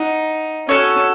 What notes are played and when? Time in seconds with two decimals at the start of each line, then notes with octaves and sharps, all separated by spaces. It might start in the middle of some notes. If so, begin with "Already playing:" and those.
Already playing: D#4 F#5
0.68 C#4 F#4 A4 C#5